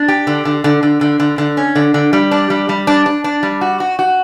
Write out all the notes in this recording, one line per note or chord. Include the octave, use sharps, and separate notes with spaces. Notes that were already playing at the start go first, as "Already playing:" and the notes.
Already playing: D4
G4
D3
D3
D3
D3
D3
D3
D3
C#4
D3
D3
G3
D4
G3
G3
D4
D4
D4
G3
F#4
F#4
F#4